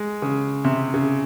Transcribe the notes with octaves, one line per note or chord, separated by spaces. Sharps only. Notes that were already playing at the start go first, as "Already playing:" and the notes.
Already playing: G#3
C#3
C3
C#3